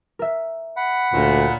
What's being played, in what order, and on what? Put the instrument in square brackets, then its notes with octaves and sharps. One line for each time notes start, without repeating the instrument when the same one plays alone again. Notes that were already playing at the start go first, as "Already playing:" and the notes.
[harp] A#4 E5
[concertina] F#5 B5
[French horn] D2 [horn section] A#2 [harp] C#5